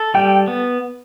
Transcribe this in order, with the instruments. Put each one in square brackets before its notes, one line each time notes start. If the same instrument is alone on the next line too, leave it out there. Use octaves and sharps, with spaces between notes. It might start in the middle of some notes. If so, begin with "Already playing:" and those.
Already playing: [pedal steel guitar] A4
[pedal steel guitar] G3 [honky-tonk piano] G5
[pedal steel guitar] B3